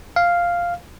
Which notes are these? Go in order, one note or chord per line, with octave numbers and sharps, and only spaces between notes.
F5